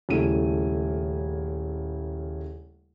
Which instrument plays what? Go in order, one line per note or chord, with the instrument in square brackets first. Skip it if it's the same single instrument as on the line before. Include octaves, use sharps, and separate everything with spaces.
[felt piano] D#1 C#3 A3 E4 D#7